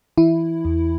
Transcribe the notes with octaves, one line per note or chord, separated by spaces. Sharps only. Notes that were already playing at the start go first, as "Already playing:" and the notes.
E3 E4
E2